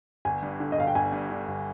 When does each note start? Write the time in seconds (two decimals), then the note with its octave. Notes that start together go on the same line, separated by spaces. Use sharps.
0.25 G1 G#5
0.43 G2
0.60 D3
0.72 D#5
0.78 G1 F5
0.87 G5
0.95 G1 G#5
1.12 G2
1.30 D3
1.48 G1